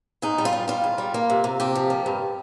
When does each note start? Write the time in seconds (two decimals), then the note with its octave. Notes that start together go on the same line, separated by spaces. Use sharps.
0.22 G#2 D#4
0.38 G3
0.45 F4
0.53 G3
0.68 G3 F4
0.84 G#2
0.98 G3
1.14 A#3
1.30 C3
1.44 C3
1.60 C3 G4
1.75 F3
1.90 A#3
2.06 G2